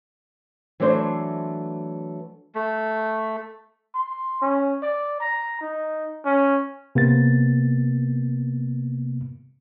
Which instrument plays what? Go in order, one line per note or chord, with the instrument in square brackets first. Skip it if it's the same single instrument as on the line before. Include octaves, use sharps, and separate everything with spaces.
[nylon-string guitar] E3 F#3 A3 D4 C5
[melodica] A3
[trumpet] C6
C#4
D5
A#5
D#4
C#4
[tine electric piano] C3 A#3 B3 A6